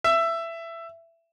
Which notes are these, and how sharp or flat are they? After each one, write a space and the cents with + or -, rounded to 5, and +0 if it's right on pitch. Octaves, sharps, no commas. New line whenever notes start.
E5 +15